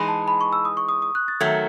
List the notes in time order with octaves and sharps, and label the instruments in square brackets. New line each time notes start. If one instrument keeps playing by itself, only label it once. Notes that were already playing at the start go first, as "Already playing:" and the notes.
Already playing: [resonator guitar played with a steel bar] E3 G#3 D#4 G#4 [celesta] B5
[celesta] A5
B5
C#6
E6
D#6
C#6
D#6
D#6
F#6
A6
[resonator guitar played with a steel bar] D#3 F#3 A3 [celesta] G#6